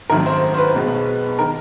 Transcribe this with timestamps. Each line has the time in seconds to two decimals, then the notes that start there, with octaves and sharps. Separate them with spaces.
0.10 G#1 F#2 D#3 F#3 A3 A#4
0.26 C5
0.54 C5
0.58 B4
0.75 B1 B2 G#3 B3
1.39 D#3 A#4